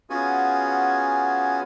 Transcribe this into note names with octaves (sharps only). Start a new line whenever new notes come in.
B3 C#4 F4 F#4 G#4 G#5